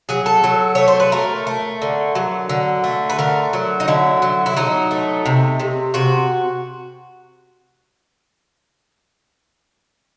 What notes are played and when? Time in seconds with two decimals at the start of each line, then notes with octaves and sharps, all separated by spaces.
0.09 F#3 G#4
0.26 A4
0.44 F#3
0.75 A3 C#5
0.88 C5
1.00 B4
1.12 A3 A#4
1.47 A3
1.82 D3
2.15 F#3
2.49 D3
2.84 A3
3.09 B4
3.18 D3 A#4
3.53 F#3
3.80 D#4
3.88 D3 E4
4.22 F#3
4.46 E4
4.56 F#3 D#4
4.91 A3
5.26 C3
5.60 C3
5.94 C3 F#4